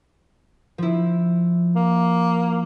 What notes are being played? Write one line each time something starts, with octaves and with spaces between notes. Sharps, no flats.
F3 E4
A#3